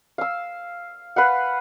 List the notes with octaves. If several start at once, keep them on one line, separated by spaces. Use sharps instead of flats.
F5 E6
B4 F5 F#5